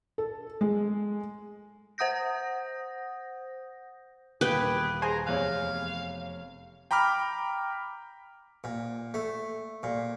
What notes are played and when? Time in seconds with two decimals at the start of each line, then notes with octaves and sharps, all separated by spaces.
0.18 A4
0.61 G#3
1.98 C5 F#5 D#6 G6 A#6
4.41 D#1 A#2 G4 G#4 B4 G5
5.02 G#4 C5 G#5 A#5
5.27 F1 E2 C#5 F5 F#6
6.91 G5 A#5 B5 D6 F6
8.64 A#2
9.14 A3
9.83 A#2